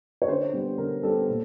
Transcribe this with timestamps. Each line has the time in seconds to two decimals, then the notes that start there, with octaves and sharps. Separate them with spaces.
0.22 C#5
0.28 D3 C5
0.53 G3 B3
0.78 D3 A#4
1.03 G3 B3 A4
1.28 A#2